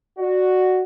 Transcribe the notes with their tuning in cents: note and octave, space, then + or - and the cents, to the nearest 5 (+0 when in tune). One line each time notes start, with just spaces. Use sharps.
F#4 +0 D5 +15